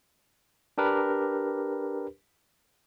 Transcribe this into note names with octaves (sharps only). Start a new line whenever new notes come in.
D4 G4 A#4 B4